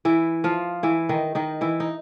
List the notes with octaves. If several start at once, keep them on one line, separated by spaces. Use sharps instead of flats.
E3 E4
F3 F4
E3 E4
D#3 D#4
D#3 D#4
E3 E4
D#4